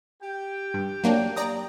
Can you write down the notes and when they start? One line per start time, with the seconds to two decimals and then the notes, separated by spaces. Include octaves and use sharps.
0.23 G4 G5
0.74 G2
1.04 F#3 A#3 D4
1.36 D5 A#5 D#6